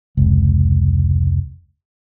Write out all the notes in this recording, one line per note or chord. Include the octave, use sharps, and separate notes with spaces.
F1 C#2